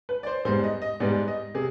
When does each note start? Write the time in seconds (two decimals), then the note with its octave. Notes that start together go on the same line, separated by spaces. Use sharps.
0.09 B4
0.23 D5
0.27 C5
0.45 G#2 G3 B3 C5
0.64 D#5
0.82 D#5
1.00 G#2 G3 B3 D5
1.28 D#5
1.55 C3 G#4